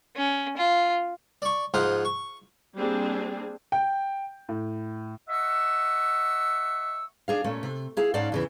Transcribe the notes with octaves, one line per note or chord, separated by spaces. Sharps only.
C#4
F4
D5 C#6
G#2 F3 F4 F5 F#5 D#6
C#6
G3 A#3 C4 D4 G#4
G5
A2
D#5 E5 F#5 C#6 E6
D4 G#4 F5
A#2 A3 C#4
C3
E4 G#4 F5
G#2 C#4 D5 F5 F#5 A5
E2 C#3 E3